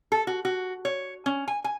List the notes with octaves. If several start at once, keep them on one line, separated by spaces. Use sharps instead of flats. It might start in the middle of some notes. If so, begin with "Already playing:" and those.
A4
F#4
F#4
C#5
C#4
G#5
G#5